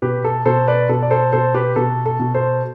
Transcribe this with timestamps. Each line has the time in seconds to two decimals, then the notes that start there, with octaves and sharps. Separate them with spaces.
0.02 B2 G4 B4
0.24 A4
0.45 B2 A4 C5
0.68 B4 D5
0.89 B2 A4
1.02 D5
1.10 A4 C5
1.32 B2 A4 C5
1.54 G4 B4
1.76 B2 A4
2.06 A4
2.19 B2
2.34 A4 C5